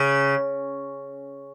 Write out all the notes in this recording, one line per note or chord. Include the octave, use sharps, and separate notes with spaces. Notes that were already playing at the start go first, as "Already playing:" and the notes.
Already playing: C#3